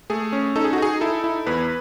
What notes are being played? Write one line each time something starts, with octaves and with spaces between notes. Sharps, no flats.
A3 G#4
C#4
D#4 A4
G#4
F#4
D#4 G#4
E4 A4
E4
E2 B4